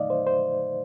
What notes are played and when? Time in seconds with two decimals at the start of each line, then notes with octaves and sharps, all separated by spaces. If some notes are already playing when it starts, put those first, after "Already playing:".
Already playing: A#2 A3 D#4 D5 D#5 F5
0.10 C5
0.27 C5